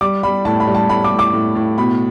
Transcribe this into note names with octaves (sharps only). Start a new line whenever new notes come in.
G3 D6
G3 B5
A2 A5
B5
G3
A5
A2 B5
D6
A2
D6
A2
A2
B2 B5